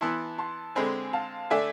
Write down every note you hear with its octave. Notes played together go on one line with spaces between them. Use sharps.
E3 B3 E4 A5 C6
A5 C6
D3 G#3 C4 G#5 B5
F5 A5
D3 A3 D4 E5 G#5